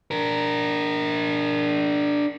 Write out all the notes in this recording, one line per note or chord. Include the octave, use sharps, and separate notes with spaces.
D4 A#4